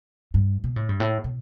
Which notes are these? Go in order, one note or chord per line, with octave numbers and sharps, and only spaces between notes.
G2
B2
A2
G2
A2
B2